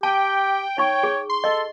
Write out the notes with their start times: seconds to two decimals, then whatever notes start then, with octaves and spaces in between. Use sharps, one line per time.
0.03 G4 G5 A5
0.78 D#4 C#5 C#6
1.03 G#4
1.30 C6
1.44 A4 D#5